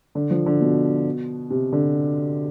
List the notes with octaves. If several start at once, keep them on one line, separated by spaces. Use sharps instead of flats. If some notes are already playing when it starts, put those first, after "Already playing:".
D3
F3
D3
B2
C3
D3